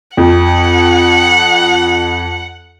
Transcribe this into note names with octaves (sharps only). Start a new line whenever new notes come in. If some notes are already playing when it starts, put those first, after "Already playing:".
F2 F#5